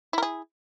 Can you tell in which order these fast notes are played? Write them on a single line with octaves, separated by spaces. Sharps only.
E4 A#4 G#4